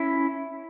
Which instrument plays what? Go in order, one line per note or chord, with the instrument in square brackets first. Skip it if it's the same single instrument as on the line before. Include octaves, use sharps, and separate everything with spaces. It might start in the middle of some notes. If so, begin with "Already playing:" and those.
Already playing: [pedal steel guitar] C#4 E4